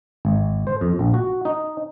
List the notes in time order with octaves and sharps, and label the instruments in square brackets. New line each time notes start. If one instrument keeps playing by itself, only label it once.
[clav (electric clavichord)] G#1
C5
F2
A#1
F#4
D#4